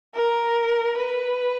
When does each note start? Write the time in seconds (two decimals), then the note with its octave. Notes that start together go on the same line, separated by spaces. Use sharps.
0.15 A#4
0.97 B4